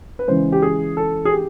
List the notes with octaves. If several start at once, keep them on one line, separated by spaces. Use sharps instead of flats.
B4
C#3 E3 G#3 C5
G4
G#4
A4
G#4
G4